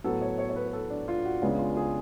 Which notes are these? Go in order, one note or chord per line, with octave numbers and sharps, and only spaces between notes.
A2 F#3 B3 A4
C#5
C#5
C#5
B4
B4
A4
D4
F4
F#4
C#2 C#3 G#3 B3 D4
F4
G#4